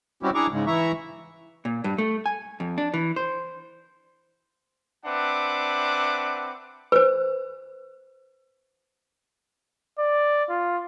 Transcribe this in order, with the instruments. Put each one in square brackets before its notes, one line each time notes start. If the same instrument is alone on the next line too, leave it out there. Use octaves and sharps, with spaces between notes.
[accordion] G3 C4 C#4 E4 F#4 G4
D4 E4 G#4 A#5 C#6 D6
G#2 C#3 G#3
E3 E4 E5 A#5 C#6
[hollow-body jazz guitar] A#2
G2
A3
G#5
F2
D4
E3
C5
[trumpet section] C4 D4 B4 E5 F#5 D6
[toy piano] B4 C5
[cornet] D5
F4